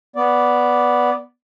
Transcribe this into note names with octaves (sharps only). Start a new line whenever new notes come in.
B3 D5